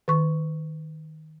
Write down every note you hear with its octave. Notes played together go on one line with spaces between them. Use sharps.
D#3 C#6